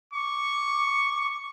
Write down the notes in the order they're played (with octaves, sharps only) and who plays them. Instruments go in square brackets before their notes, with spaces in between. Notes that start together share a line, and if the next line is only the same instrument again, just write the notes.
[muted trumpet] C#6 [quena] D6